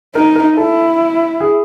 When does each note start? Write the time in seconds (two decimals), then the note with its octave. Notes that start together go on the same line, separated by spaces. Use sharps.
0.15 D#4 A#4
0.36 A#4
0.57 E4 A4
1.40 G#4